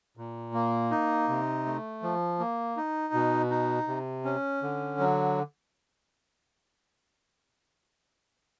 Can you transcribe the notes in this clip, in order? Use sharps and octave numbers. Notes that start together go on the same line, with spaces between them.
A#2
A#3
D#4
C3
A3
F3
A#3
D#4
B2
D#4
C3
C#4
D3
F#3